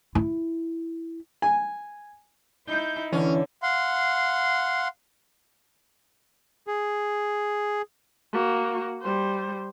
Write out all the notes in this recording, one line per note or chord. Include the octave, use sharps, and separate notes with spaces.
E4
G#5
D#4 E4 G6
D3 E3 C#4
F5 F#5 C6
G#4
A#3 F#4
G3 C5